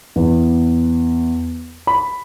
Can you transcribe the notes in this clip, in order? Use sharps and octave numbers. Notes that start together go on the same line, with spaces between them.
E2
B5